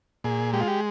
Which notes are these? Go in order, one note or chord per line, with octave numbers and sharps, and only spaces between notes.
A#2 G#4
G#3 G4
F4
G4